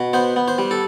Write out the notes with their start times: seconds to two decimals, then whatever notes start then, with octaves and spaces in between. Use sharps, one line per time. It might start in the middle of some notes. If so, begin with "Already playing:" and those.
Already playing: B2
0.13 B3 C5
0.36 B3
0.48 C5
0.58 G3
0.71 A4